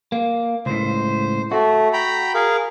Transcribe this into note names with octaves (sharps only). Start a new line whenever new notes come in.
A#3
C#2 A2 C5
A3 F#4
G5 A#5 B5
G#4 A#4 F5